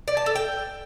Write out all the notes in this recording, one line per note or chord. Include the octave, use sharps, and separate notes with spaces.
D5
A5
A4
G5